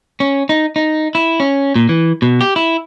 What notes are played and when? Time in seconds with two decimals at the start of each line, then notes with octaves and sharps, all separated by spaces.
0.20 C#4
0.49 D#4
0.76 D#4
1.15 E4
1.40 C#4
1.76 A#2
1.89 E3
2.22 B2
2.41 G4
2.56 E4